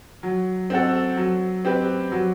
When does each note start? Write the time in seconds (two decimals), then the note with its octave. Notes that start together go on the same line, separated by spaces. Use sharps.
0.23 F#3
0.70 C4 F#4 A4
1.17 F#3
1.65 C4 G4 B4
2.12 F#3